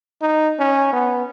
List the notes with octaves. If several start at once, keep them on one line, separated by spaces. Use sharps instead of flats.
D#4
C#4
B3